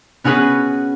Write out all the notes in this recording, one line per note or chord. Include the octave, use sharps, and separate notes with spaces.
B3 C#4 F#4 G#4 B4